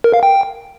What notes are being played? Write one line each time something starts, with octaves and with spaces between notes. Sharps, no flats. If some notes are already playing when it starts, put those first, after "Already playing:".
A#4
F5
G5